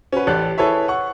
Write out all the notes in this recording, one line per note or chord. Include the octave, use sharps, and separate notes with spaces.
C#4 F#4 B4
A1 G4 A4 D5 F#6
E4 G#4 A4 B4 C#5 E5
F#5 C#6